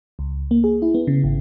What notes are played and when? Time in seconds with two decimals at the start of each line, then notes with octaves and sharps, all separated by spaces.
0.19 C#2
0.51 A#3
0.64 G#4
0.82 E4
0.94 B3
1.07 C#3
1.24 G#1